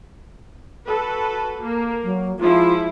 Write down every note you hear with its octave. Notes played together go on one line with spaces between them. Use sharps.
F#4 A4 B4
A#3
F#3
F3 G#3 E4 F4